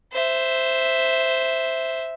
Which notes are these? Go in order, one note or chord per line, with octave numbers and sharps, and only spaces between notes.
C5 E5